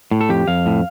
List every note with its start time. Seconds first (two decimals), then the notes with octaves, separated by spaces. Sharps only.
0.11 A2
0.21 A4
0.29 F2 G4
0.48 F2 F5
0.66 A2